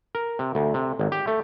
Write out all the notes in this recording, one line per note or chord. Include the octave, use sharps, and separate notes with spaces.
A#4
C3
D2
C3
G#1
G4
A3